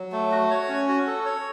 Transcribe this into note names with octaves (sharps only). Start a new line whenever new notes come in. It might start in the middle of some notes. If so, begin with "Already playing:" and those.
Already playing: F#3
A3
F#4
C#5
C#4
F#4
A4
C#5